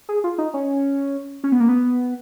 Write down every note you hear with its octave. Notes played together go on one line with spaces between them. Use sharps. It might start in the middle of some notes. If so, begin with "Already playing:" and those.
G#4
F4
D#4
C#4
C#4
B3
A#3
B3